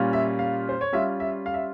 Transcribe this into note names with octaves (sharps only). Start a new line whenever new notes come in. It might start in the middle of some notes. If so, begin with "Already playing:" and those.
Already playing: A#2 G3 C#4 F4
E5
F5
C5
C#5
G3 C#4 F4 E5
E5
F5
E5